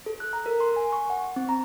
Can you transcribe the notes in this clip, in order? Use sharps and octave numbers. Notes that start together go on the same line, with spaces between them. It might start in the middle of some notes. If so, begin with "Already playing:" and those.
A4
F#6
A#5
A#4
C6
G#5
C#6
F#5
C4
A#5